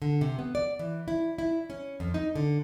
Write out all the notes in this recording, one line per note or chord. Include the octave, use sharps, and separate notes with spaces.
D3
C3
B3
D5
E3
E4
E4
C#4
F2
D#4
D3